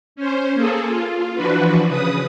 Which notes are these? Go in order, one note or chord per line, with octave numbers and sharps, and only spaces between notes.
C#4 C5
A#3 G#4 A4
F4
E3 F3 D4 F#4 B4
C#3 B4 D#6